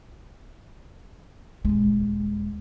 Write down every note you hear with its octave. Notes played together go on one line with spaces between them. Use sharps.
D#1 G#3